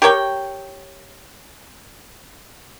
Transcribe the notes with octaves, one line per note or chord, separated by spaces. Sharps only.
G4 A#4 C#5 G5